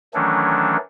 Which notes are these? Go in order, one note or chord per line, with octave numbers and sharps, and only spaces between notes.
D#3 E3 F#3 A3 C#4 D4